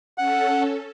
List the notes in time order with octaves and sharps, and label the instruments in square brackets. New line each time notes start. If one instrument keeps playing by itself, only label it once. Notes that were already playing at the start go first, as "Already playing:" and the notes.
[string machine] C#4 A4 [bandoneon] F#5